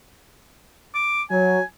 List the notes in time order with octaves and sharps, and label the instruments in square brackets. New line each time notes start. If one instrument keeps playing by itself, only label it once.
[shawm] D6
[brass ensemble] F#3 [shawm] G#5